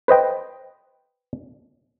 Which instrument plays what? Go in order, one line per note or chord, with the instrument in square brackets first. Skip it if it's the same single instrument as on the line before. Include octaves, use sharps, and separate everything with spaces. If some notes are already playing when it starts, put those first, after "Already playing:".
[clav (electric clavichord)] B4 C5 D#5 G5